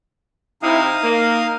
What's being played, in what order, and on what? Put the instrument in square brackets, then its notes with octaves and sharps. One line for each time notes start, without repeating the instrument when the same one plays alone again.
[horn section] C3 E4 [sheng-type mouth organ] D#4 F5 D#6
[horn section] A#3